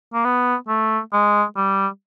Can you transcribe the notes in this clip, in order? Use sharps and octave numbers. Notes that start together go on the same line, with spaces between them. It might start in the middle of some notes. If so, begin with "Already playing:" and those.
A#3
B3
A3
G#3
G3